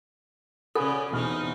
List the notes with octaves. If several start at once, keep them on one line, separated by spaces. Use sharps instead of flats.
C#3 C#4 F#4 G#4 A4 B4 D5
E2 B2 C4 C#4 D#4 F6